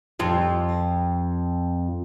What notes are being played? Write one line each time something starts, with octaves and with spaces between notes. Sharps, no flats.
F2 F4